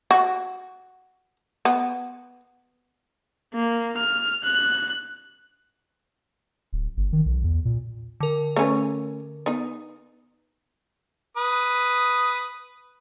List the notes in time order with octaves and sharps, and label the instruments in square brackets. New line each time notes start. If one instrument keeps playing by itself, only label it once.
[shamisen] F#4
B3
[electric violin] A#3
F6
F#6
[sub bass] D1
G1
D#3
B1
E2
A#2
[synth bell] D3 A#4
[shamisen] A3 C#4 B4
B3 D#4
[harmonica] B4 D#6